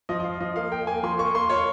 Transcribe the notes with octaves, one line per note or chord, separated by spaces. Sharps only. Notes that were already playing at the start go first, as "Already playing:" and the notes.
F3 D#5
D#5
F4 F5
F3 D#5
A#3 F5
A#3 G5
A#3 G#5
F3 C6
A#3 C#6
A#3 C6
F4 C#5